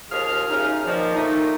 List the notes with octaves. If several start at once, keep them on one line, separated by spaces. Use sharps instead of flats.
D#2 F3 G#4 F6
F#2 C#3 C#4 D#4 F6
A#2 D#3 F3
A#2 A3 D#4